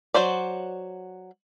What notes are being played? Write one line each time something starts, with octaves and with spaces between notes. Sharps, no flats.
F#3 F#4 C5 D5